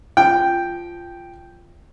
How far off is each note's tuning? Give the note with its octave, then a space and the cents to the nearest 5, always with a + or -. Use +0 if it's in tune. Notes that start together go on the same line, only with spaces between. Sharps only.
F3 -10 G5 +0